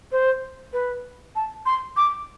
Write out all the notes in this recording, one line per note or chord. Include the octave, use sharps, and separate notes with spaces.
C5
B4
A5
C6
D6